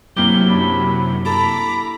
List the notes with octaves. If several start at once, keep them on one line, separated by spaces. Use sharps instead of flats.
F#2 C3 F#3 A#3 E4 G4 G7
D4 E4 B5
E4 A4 A#5 B5 D6